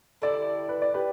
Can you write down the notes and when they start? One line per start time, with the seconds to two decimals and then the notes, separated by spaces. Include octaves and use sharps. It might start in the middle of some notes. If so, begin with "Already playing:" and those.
0.22 D3 G3 E4 G4 A4 D5
0.69 B4
0.82 D5
0.94 G4 B4